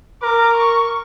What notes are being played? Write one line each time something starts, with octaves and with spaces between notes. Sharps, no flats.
A#4 D6
C#6